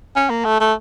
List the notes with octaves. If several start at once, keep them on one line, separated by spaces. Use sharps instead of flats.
C#4
A#3
A3
A3